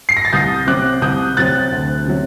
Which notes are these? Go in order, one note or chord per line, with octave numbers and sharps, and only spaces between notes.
C7
A#6
A6
C2 D#6 G6
C3 F#3 C4 D6 F#6
C2 D#6 G6
C3 F#3 C4 F#6 A6
D2
C3 F#3